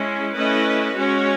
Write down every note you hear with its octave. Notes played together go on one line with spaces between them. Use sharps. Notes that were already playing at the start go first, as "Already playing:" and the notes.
Already playing: G#3 C#4 E4
A3 C#4 E4 B4 D#5
G#3 C#4 F#4 C#5